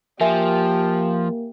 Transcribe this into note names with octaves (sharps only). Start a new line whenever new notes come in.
F3 A#3 G4 A#4 E5 G#5